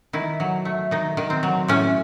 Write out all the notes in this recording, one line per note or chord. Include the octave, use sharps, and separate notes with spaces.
D#3 E4
F#3
A3
D#3 D#4
D#3
C4
F#3
A2 C#4